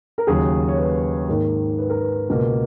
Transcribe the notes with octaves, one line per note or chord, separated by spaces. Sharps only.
A#4
D#2 C#3 F#3 G#4
C#5
B4
G#2 D#3 A#3
B4
A#4
B4
C#2 B2 A#3